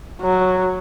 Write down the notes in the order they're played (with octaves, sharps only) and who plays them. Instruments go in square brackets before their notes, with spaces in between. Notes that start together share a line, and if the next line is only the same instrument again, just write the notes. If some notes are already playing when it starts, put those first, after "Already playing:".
[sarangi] F#3